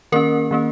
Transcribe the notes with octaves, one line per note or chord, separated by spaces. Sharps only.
D#3 A#3 C#4 A#4
D#3 A#3 C#4